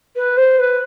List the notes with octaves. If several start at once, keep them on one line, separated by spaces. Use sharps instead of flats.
B4
C5
B4